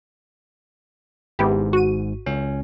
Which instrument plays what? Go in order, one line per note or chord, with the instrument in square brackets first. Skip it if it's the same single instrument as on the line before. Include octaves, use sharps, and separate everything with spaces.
[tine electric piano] G#1 G#2 [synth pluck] B3 E4 G4
[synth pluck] F#4 D#7
[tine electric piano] C#2 C#4